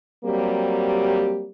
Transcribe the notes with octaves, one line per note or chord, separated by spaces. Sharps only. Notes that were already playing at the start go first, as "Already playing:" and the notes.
F#3 G3 A#3 C4 G4